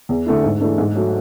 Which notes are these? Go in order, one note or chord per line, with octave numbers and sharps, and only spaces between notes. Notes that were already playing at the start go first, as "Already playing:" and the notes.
E2
D3 A3 E4
G#2
E3 A3 D4
G#2
F#3 A3